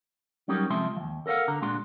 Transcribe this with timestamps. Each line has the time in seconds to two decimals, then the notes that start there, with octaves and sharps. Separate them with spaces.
0.48 F#3 G3 C#4 D#4 G4 A#4
0.70 C3 F3 G#3 E5 C6
0.96 D#2 F3
1.26 A4 A#4 C5 F5 F#5
1.48 D3 A#5
1.62 A#2 G#3 D4 F#4 C6